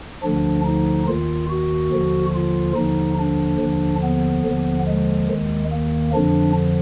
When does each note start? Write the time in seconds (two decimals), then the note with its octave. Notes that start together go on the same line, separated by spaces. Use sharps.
0.23 D2 D3 F3 D4
0.66 D#4
1.08 D#2 D#3 F4
1.50 F#4
1.93 D#2 D3 F3
2.35 F4
2.76 D#2 D3 F3 D#4
3.19 D4
3.60 D#2 D3 F3
4.03 B3
4.46 D#2 D3 F3
4.88 G#3
5.29 D#2 D#3
5.72 A#3
6.14 F2 D3 F3 D4